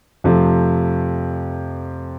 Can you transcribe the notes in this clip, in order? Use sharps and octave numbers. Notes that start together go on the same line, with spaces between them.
F2 C3 F3 A3